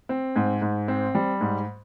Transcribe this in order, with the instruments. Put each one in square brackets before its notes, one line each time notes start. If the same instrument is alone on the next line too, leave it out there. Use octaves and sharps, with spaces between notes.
[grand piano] C4
G#2
G#2
C4
G3
G#2